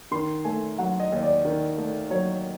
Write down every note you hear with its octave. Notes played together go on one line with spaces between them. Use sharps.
D#3 C6
A3 G#5
F#3 F#5
D#5
D#2
D5
D#3
A3
F#3 C#5